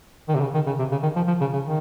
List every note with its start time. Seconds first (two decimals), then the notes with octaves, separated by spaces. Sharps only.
0.29 D#3
0.35 C3
0.41 C#3
0.54 D#3
0.67 C#3
0.79 C3
0.91 C#3
1.03 D#3
1.16 F3
1.27 F3
1.41 C#3
1.53 C#3
1.65 D#3